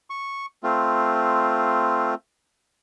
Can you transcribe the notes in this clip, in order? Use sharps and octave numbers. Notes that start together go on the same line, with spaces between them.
C#6
A3 C4 F4